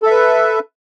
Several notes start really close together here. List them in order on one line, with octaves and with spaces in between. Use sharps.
A4 E5 B4